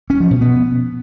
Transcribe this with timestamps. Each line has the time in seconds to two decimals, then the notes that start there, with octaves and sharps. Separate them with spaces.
0.10 C#4
0.20 F3
0.31 B2
0.41 B3